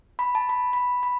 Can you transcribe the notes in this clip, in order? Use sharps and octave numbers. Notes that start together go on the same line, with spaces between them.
B5
A5
B5
B5
B5